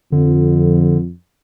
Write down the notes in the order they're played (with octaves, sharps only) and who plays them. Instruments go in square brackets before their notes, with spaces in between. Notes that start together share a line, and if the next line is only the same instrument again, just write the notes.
[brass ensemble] F2 [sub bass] D3